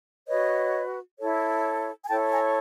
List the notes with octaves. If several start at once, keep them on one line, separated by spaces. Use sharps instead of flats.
F#4 B4 C#5 D#5
E4 A4 C#5
G#5
E4 A4 C#5 G5 A5
G#5 A#5